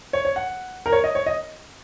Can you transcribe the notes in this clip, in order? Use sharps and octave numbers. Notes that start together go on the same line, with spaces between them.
C#5
C#5
F#5
A#4
C#5
D#5
C#5
D#5